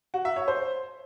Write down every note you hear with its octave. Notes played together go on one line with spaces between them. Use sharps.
F#4
E5
C#5
C5